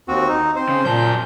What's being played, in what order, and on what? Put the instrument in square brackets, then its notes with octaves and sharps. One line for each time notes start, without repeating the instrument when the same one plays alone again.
[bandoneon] D#2 C4 F#4
D#4
[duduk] C4 [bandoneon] C5
[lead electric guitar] C#3
[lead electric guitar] F#2 A5 [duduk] A#2 [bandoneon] G6